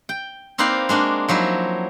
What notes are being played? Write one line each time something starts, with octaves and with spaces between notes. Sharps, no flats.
G5
A#3 C4 D#4 B4 D5 F5
G#3 A#3 D4 F#4
F3 F#3 D#4 E4